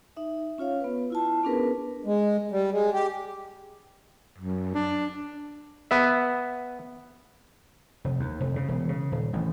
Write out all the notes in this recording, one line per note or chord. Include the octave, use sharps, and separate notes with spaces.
D#4 E5
C#4 F4 C#5 F5
B3 B4
E4 F4 A5
B3 C#4 D4 G#4 A#4 B4
G#3
G3
G#3
G4
F#2
D4
B3 E5
F1
D#2
F1
C#3
E1
C#3
D#1
A1